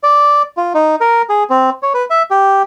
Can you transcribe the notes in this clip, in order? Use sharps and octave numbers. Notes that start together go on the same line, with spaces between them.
D5
F4
D#4
A#4
G#4
C4
C#5
B4
E5
G4